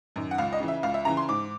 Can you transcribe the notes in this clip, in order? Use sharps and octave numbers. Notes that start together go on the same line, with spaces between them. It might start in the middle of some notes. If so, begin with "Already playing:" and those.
F#2 D#3
F#5
C#2 F5
D#5
C#3 E3
E5
C#2 F5
E5
C#3 E3 A#5
C6
G#2 D6